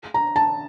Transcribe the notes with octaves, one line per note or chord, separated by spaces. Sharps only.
A#5
A5